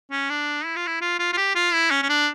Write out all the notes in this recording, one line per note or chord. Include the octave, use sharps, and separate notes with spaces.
C#4
D4
E4
F4
E4
F4
F4
F4
G4
F4
E4
C#4
C#4
D4